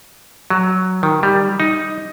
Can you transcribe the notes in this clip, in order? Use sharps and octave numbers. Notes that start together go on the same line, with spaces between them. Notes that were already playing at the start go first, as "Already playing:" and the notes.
F#3
D#3
G3
D#4